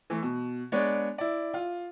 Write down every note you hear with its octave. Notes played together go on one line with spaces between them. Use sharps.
E3 A3
B2
G#3 B3 D4 C#5 D5
E4 D5
F4